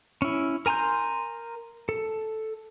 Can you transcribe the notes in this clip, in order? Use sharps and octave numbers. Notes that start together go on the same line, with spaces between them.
C#4 E4
A#4 G#5 A#5 C6 G6
A4